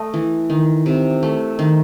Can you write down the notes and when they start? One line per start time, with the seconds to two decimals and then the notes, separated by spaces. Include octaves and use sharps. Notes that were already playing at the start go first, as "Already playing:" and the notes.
Already playing: A3 D#5
0.14 E3
0.50 D#3
0.86 C3
1.23 A3
1.59 D#3